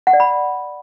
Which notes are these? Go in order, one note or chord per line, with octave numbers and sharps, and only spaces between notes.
F#5
D5
B5